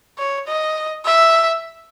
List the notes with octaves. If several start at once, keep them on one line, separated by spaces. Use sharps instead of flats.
C#5
D#5
E5